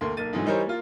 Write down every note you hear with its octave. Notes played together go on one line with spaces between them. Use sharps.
D2 A#3 C6
B1 A#3 A6 D#7
G#2 D3 E3 F#3
E3 G3 D#4 A#4 C5 C#5
A#3 F4